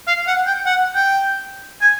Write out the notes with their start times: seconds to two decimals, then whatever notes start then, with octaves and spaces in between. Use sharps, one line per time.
0.07 F5
0.28 F#5
0.47 G5
0.66 F#5
0.95 G5
1.82 G#5